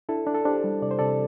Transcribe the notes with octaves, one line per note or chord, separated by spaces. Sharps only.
D4 E4 A4
D4
A4
D4 G4 C5
G3
C3 D5
C5
C3 A4 D5